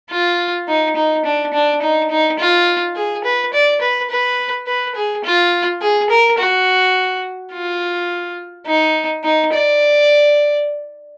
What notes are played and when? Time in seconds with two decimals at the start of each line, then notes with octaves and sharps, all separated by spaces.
0.11 F4
0.68 D#4
0.96 D#4
1.25 D4
1.54 D4
1.82 D#4
2.10 D#4
2.39 F4
2.96 G#4
3.24 B4
3.54 D5
3.82 B4
4.10 B4
4.67 B4
4.95 G#4
5.24 F4
5.82 G#4
6.10 A#4
6.38 F#4
7.53 F4
8.66 D#4
9.24 D#4
9.52 D5